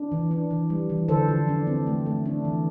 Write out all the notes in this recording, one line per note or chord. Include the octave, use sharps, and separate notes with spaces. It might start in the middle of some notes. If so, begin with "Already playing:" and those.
Already playing: D4
E3
D4
E3
G3
E3
D3 A4 C5
F3
D4
C4
A3
A3
D4
E3